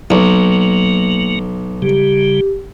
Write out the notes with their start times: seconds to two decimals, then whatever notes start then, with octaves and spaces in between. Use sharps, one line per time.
0.10 B1 F#3 A#3
1.82 C#3 G3 G4